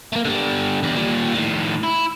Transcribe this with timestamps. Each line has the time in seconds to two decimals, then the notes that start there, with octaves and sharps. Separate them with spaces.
0.13 A3 A#3
0.25 D3 G3
0.83 E2 G3
0.96 A#2 G3
1.34 A2 D#3
1.84 E4